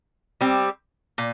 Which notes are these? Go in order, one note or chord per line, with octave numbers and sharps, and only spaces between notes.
G3 C4 G4
A#2